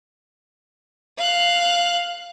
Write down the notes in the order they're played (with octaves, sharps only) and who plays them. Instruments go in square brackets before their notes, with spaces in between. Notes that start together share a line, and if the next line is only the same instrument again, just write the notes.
[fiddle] F5 F#6